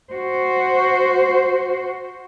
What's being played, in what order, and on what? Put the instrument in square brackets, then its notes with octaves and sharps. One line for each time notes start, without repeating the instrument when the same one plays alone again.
[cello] F#4 C5